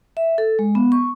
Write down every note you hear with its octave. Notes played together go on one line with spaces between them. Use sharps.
E5
A4
G#3
B3
C#6